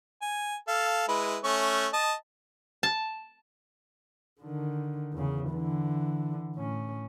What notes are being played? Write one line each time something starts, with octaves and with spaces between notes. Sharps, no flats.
G#5
A4 F5
G#3 E4 B4
A3 C#4 C#6
D#5 A5
A5
D3 D#3
E2 C#3
D3 E3
A2 C#4